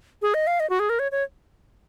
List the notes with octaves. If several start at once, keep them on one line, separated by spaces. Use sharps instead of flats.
G#4
D#5
F5
D#5
F#4
G#4
A#4
C#5
C#5